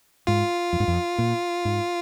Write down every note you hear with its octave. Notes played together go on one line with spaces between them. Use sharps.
G#2 F4
F2
G#2
F2
A#2
G#2